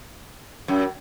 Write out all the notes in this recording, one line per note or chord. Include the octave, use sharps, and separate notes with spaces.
F#2